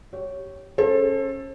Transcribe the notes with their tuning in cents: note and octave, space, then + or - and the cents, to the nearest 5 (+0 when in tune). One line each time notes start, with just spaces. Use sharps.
G4 -20 C#5 +0
C#4 -10 A4 +0 C5 +40